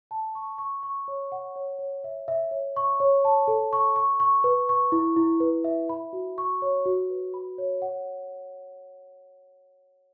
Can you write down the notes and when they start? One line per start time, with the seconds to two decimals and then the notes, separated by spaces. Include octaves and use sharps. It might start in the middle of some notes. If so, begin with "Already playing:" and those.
0.11 A5
0.35 C#6
0.58 C#6
0.83 C#6
1.08 C#5
1.32 F#5
1.56 C#5
1.79 C#5
2.04 E5
2.28 E5
2.51 C#5
2.76 C#6
3.00 C#5
3.25 A5
3.48 A4
3.73 C#6
3.96 C#6
4.20 C#6
4.44 B4
4.69 C#6
4.92 E4
5.16 E4
5.40 B4
5.64 E5
5.89 B5
6.13 F#4
6.38 C#6
6.62 C#5
6.85 F#4
7.10 B4
7.34 B5
7.58 C#5
7.82 F#5